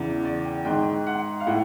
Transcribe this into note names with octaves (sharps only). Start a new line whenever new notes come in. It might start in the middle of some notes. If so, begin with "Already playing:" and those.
Already playing: E2 C#3 E3
D5
G5
G#2 D#3 G5
F#5
F5
A2 F#5